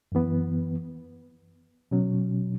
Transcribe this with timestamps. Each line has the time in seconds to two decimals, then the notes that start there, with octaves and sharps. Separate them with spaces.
0.12 F#2 E3 B3
1.91 B2 F#3 C#4